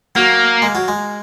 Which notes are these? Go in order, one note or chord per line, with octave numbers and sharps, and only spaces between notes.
F#3 A#3
G#3
F#3
G#3